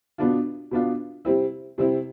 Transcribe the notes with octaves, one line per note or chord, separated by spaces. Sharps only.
B2 B3 D4 F4
B2 B3 D4 F4
C3 G3 C4 E4
C3 G3 C4 E4